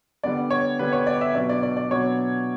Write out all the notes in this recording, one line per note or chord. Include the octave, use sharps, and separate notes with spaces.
D3 G3 B3 D4 D5
C#5
D3 G3 B3 D4 B4
C#5
D5
E5
B2 F#3 B3 D4 D5
D5
D5
D5
B2 F#3 B3 D4 C#5